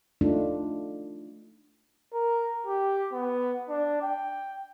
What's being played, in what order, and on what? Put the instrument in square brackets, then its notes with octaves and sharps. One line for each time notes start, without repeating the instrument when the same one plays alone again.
[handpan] A3 D4 D#4 F4
[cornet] A#4
G4
B3
D4
G5